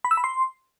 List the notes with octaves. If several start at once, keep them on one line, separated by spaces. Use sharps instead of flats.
B5
E6
B5
C6